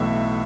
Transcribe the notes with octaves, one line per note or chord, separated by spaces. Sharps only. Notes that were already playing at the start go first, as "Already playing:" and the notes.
Already playing: B1 A2 E3 B3 E5